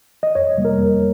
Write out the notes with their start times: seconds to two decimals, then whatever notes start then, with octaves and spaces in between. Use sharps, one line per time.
0.23 D#5
0.35 F2 C#5
0.57 C3 G3 A#3
0.65 A#4
0.78 F2